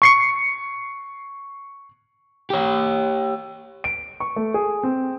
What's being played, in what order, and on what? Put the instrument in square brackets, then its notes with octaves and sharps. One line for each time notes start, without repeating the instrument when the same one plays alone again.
[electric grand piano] C#6 C7 C#7
[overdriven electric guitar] G4 C#5
[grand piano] D7
C#6
A3
G#4
C4